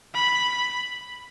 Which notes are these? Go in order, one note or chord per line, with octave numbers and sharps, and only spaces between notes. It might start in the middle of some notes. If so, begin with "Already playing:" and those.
B5